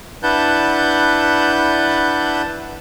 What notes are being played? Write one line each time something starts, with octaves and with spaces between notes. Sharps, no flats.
D4 E4 B4 F#5 A5 G6